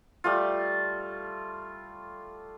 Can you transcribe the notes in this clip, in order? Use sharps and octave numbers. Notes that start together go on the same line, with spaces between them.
G3 A3 F4